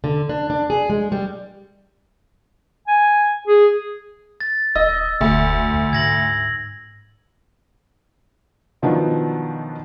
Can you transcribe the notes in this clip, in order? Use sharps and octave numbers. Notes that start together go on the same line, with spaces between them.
D3
D4
D4
G#4
G#3
G3
G#5
G#4
A6
D1 D#5 E6
E1 D2
C2
G#2 G#6 A#6 F#7
B2 D#3 F3 F#3 B3 D4